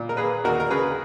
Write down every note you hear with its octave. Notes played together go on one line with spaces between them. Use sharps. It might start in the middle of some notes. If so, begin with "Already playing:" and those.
Already playing: A#2
A#4
A#3 G#4 B4
D#2 F#4 A#4
A#4
C#3 G#4 B4